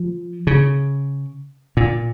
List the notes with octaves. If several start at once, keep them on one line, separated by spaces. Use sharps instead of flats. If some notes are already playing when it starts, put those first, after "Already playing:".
Already playing: F3
C#3
A#2